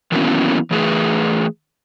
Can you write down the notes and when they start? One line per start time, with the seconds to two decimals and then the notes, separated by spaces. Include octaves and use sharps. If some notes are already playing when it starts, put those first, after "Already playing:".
0.12 D#3 E3 F#3 A#3 B3 C#4
0.71 E3 A3 G#4 B4